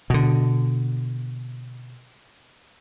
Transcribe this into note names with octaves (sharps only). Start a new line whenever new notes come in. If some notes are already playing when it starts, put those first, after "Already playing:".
B2 D3